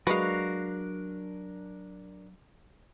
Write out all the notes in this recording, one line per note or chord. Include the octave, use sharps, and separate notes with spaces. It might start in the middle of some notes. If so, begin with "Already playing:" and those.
F#3 G#3 D4 F#4 A#4 B4 F5